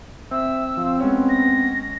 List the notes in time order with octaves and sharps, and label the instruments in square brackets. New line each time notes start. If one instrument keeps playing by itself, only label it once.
[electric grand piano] C4 [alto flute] E5 [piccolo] E6
[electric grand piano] F3 [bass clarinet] C4 [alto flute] F5
[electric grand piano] G#3 C#4 C#5 [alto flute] B3
[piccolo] A#6